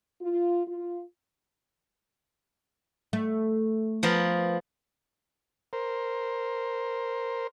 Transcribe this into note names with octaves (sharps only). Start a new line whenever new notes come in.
F4
F4
A3
F3 B3 A#4
A#4 C5